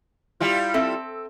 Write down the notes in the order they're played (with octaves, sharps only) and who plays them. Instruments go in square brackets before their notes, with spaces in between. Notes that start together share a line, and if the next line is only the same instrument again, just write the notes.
[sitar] G3 E4 F4
[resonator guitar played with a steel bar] C4 A4 E5